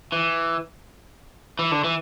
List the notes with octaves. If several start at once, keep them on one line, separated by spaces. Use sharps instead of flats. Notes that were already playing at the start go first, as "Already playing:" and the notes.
E3
E3
D3
E3